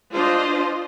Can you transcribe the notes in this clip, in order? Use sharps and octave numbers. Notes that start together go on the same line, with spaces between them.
D4 F4 C5 D#5